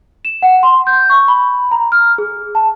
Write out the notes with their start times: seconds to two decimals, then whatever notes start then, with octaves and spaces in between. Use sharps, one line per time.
0.25 E7
0.42 F#5
0.63 C6
0.87 G6
1.10 C#6
1.28 B5
1.71 A#5
1.92 F6
2.18 G#4
2.55 A5